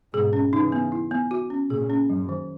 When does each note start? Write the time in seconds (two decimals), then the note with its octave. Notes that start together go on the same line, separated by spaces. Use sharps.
0.13 G#2 B2 G#4
0.33 C#4
0.53 C#3 E3 D#4
0.72 B3
0.92 E4
1.11 B3
1.31 F#4
1.50 C#4
1.70 A#2 C#3 G#4
1.90 C#4
2.09 F#2 F#3
2.29 D#3